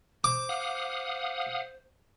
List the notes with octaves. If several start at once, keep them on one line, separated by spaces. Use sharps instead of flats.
C5 D6
F5 F#5 D#6